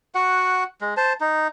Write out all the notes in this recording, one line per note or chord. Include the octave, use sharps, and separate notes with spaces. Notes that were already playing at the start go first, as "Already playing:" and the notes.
F#4 F#5
G#3
C5 A5
D#4